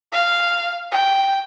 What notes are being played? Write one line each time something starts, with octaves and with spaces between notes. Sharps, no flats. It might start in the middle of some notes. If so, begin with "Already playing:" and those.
F5
G5